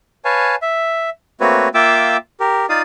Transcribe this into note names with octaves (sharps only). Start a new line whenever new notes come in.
B4 C#5 F5 G#5 A5
E5
A3 A#3 C4 F#4 B4 C#5
A#3 F4 E5 G5 D6 E6
G4 A#4
D#4 F4 D5 F5 D#6